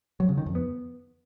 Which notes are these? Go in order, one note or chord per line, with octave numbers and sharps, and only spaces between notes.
F#3
C#3
D#3
F2
B3